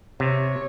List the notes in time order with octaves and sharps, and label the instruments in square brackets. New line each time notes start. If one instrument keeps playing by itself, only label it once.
[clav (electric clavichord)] C3 [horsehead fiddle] C#5